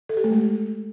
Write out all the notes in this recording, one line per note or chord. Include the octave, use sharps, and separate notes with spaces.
A4
G4
A3
G#3